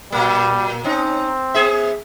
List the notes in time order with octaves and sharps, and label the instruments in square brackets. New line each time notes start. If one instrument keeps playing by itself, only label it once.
[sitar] A#2 A#3 [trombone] G3
[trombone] C4 [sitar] C#4 D#4
[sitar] B3 G#4 E5